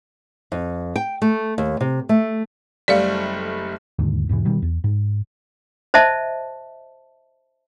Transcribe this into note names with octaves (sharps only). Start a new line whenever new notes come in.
F2
G5
A3
D#2
C3
A3
F#1 G3 A3 D5 F5
E1 D#2 G#2 D3
E2 G#2 B2 E3
B2 D#3 G3
E2
G#2
C5 D#5 E5 A5